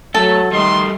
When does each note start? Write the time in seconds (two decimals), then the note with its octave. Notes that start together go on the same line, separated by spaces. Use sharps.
0.15 F#3 A3 A4
0.52 D#3 G3 A3 C6